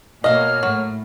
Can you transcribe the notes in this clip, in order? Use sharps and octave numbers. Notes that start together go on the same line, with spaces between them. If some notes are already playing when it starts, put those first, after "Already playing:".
B2 A#3 C#5 D#5 F5 F6
A2 F#3